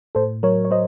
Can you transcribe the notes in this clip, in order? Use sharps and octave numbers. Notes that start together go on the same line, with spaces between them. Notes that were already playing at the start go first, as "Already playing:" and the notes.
A2 A4 C5
F#3 A#4 C#5
C#5
F#3 C5 D#5